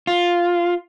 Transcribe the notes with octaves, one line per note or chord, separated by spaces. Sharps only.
F4